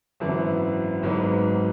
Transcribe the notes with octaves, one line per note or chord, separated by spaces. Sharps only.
G#1 F#2 E3 B3
G#1 G#2 F#3 B3